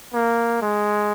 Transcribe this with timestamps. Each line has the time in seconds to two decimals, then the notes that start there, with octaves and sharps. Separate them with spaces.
0.13 A#3
0.62 G#3